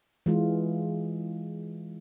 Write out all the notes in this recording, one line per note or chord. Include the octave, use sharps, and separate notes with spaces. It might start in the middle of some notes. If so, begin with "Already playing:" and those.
E3 G#3 F4